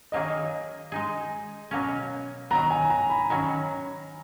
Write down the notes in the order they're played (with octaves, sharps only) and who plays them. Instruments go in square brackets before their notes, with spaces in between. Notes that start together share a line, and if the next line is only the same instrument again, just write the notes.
[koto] D#3 F#3 A#3 D#4 G#4 [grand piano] D#5
[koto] G#3 D#4 G#4
B2 F#3 A#3 C#4
[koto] D#3 F#3 B3 [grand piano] A#5
[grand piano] G#5
A#5
B5
[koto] D#3 F#3 C#4 F#4 [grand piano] A#5